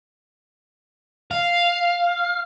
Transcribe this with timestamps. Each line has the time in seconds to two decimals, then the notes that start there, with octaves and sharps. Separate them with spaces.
1.31 F5